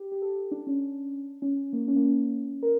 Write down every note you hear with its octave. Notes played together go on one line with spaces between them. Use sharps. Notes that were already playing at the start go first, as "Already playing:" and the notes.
Already playing: G4
G4
A4
D4
C#4
C#4
A#3
C#4
A#3
C#4
A#4